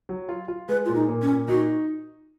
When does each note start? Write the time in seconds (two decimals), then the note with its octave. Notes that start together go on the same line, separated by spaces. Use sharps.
0.09 F#3
0.29 F4
0.48 F4
0.69 G#3 B4
0.85 A#2 F4
0.95 D#4
1.08 A#2
1.22 C#4
1.28 A#2
1.48 D#4 F#4